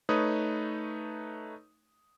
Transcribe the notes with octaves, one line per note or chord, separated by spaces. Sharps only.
A3 D#4 B4 C#5 D#6